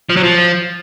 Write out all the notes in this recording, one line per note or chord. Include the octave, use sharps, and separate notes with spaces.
F3
F#3
F3